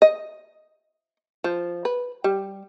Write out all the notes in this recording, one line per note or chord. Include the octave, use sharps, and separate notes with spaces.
D#5
F3
B4
G3